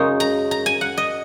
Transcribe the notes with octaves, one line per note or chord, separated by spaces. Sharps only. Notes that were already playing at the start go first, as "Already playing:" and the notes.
Already playing: F#2 C#3 G#3 D#4 C6
A#5
A#5
G#5
F#5
D#5